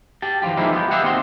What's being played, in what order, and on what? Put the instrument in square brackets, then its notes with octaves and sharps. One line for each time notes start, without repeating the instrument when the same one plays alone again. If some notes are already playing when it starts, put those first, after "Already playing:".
[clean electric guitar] G4 A5
E3 F3 G3 F4 G4
F3 G#3 A#3 C4 D#4 E4
B3 G4
F4 G4 G#4 E5 F#5
D#2 C4 D#5 C6